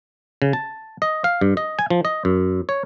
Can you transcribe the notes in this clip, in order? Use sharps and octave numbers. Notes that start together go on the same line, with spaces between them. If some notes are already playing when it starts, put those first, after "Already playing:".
C#3
A5
D#5
F5
G2
D#5
G#5
F3
D#5
F#2
C#5